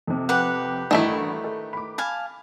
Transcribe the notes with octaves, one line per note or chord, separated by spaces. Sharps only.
F2 C3
G4 B4 F#5
A1 D2 G2 D#3 A3 E4
A4
B5 D6
F5 G#5 A5